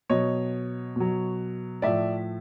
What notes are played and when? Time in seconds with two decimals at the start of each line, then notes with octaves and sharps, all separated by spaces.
0.10 B2 F#3 C#5 D#5
0.96 B2 F#3
1.82 A2 F3 D5 E5